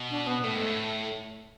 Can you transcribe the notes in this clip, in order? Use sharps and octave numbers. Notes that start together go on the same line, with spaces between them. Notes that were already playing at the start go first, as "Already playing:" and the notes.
Already playing: B2
D4
B3
A2 A3
G#2
A2